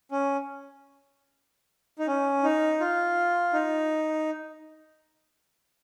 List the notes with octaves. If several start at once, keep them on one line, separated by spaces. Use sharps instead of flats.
C#4
D#4
C#4
D#4
F4
D#4